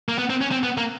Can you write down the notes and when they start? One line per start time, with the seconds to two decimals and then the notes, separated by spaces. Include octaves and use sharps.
0.09 A#3
0.18 B3
0.30 C4
0.41 C#4
0.51 C4
0.63 B3
0.77 A#3